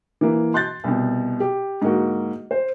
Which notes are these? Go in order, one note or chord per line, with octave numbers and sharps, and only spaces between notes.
E3 A#3
C6 F#6 G6 A6
C2 B2
G4
G#2 D3 A#3 F#4
C5